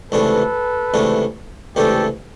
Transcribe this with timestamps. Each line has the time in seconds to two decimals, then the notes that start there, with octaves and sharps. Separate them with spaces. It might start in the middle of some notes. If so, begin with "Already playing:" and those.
0.12 C#2 C3 E3 A3 D4 A4 B4
0.94 C#2 C3 E3 A3 D4
1.76 C#2 C3 E3 A3 D4 G4 A4